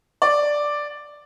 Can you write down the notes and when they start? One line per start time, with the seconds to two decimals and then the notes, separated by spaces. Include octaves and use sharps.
0.22 D5